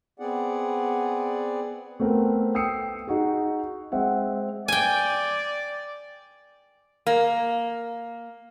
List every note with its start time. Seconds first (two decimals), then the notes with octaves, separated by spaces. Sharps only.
0.20 B3 C4 G#4 D5 F#5
2.00 A3 B3 C4 A#4
2.55 G5 D#6 E6 C7 C#7
3.08 D#4 F#4 G#4
3.92 G#3 C4 E5 F#5
4.68 D5 G5 G#5
7.07 A#3